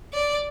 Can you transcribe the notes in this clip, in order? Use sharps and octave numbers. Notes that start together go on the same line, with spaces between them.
D5